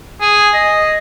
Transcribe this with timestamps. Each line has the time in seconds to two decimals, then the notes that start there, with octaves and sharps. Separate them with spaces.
0.21 G#4
0.54 D#5